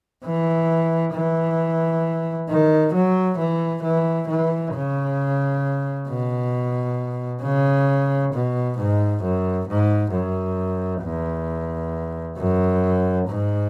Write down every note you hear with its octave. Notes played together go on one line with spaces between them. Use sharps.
E3
E3
D#3
F#3
E3
E3
E3
C#3
B2
C#3
B2
G#2
F#2
G#2
F#2
E2
F#2
G#2